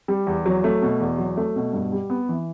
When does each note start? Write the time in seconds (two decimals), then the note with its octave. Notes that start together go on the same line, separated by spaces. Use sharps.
0.08 G3
0.27 E2
0.46 F#3
0.64 A3
0.82 B2
1.00 E2
1.19 F#3
1.37 A3
1.56 B2
1.73 G2
1.92 G3
2.10 B3
2.29 E3